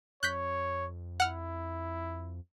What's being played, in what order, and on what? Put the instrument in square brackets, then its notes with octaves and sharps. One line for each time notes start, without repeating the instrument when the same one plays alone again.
[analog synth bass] F2 [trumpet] C#5 [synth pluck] F#6 G6 B6
[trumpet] E4 [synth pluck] F#5 F6